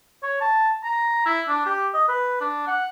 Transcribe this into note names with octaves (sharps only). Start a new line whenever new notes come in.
C#5
A5
A#5
E4
D4
G4
D#5
B4
D4
F#5